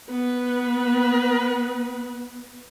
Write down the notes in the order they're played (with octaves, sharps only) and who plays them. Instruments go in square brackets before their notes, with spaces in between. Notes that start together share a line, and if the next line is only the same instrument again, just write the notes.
[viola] B3 B4